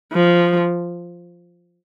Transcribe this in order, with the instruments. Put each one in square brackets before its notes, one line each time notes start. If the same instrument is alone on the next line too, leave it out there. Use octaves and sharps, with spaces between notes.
[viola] F3